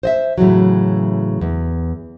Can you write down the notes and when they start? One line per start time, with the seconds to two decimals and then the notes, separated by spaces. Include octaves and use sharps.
0.03 C5 D#5 E5
0.38 A2 C#3 E3 F#3
1.41 E2